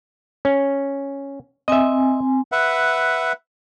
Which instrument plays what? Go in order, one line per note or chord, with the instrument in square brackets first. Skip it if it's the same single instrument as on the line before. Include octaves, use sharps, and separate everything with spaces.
[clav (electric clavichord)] C#4
[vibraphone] C4 G#5 [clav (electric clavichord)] D#5 E5
[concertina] B4 E5 F#5